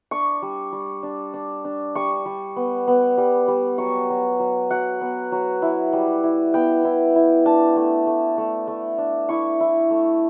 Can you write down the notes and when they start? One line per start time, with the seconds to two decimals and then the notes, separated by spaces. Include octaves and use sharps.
0.11 D4 C#6
0.42 G3
0.73 G3
1.03 D4
1.34 D4
1.65 D4
1.95 G3 C#6
2.26 G3
2.56 B3
2.87 B3
3.18 G3
3.48 G3
3.78 F#3 C#6
4.10 F#3
4.39 F#3
4.70 F#3 F#5
5.01 B3
5.32 F#3
5.62 E4
5.93 G3
6.23 E4
6.54 B3 G5
6.85 E4
7.16 E4
7.46 D4 A5
7.76 A3
8.07 A3
8.38 A3
8.68 A3
8.98 D4
9.29 E4 C#6
9.60 E4
9.90 A3